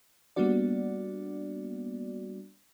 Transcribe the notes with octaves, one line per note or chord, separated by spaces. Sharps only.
G3 A#3 B3 D4 F#4 D5